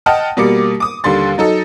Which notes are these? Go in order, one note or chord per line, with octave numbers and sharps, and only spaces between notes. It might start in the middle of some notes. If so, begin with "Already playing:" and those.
D#5 F#5 G5 A5 F6
B2 G3 A#3 D6 C#7
D6 D#6
D#2 D3 G3 C6 A6
F#3 D#4 A4